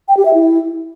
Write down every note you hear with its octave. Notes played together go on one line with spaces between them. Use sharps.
G5
G4
E5
E4